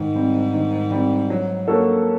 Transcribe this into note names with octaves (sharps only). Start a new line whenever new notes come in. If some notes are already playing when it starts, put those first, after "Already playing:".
Already playing: G#2 D#3
G3 C4
D#3
G3 C4
F#3
A#3 C#4 F#4 A4